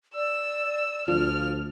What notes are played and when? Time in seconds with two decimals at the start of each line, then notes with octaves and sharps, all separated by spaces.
0.15 D5 E6
1.08 D2 F3 F6